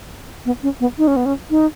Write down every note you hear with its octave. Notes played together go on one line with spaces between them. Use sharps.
B3
C#4
B3
D#4
C#4
B3
C#4
D#4